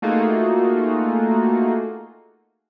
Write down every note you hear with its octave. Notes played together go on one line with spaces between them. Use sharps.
A3 A#3 D#4 F4 F#4 G#4